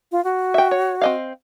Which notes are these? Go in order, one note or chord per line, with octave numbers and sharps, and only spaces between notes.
F4
F#4
E5 G5
C#5
C4 D#5 F5